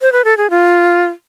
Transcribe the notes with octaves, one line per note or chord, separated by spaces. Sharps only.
C5
B4
A4
G#4
F4